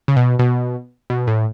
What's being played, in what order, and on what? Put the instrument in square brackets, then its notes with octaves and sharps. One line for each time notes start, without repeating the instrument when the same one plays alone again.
[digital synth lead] C#3
B2
B2
B2
A2